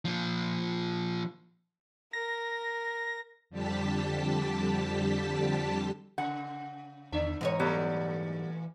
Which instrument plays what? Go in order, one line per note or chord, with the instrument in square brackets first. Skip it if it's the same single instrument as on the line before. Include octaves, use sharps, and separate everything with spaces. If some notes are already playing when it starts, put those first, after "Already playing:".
[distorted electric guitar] A#2 F3
[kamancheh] A#4 [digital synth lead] A#6
[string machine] F2 D3 G3 G4 A5 B6
[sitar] C#3 [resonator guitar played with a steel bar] F#5
[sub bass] E2 [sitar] D3 D4 E5
[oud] G#2 D#4 C#5 [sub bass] E3 [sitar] B3
[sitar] A#2 A3 [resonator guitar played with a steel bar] F#3 G3 B3